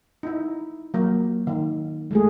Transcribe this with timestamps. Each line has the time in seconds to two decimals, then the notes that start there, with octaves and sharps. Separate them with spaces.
0.23 D#4 E4
0.94 F#3 A#3
1.47 D#3
2.11 G#3 A3 G#4